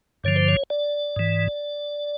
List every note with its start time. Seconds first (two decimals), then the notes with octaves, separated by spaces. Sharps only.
0.24 G2 D3 F3 C#5
0.36 C5
0.48 C#5
0.70 D5
1.16 G#2 E3